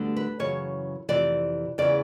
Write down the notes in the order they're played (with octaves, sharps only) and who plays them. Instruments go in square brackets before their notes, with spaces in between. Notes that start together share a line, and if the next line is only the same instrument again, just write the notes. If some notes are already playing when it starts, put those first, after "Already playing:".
Already playing: [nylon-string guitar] D2 D3 G3 B3
B4
F#2 C#3 E3 C#5
F2 C3 E3 D5
E2 C#3 E3 D5